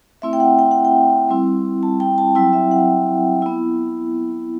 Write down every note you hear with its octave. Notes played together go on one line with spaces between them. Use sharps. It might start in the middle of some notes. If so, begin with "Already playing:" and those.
A3 C4 E4 E5
G5
F#5
G5
F#5
G5
G3 C4 E4
A5
G5
A5
F#3 C4 E4 G5
E5
F#5
B3 E4